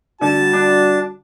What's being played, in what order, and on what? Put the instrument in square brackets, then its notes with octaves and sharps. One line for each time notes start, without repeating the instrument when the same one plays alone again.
[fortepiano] D3 [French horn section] G3 F#4 [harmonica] A5
[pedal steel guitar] D4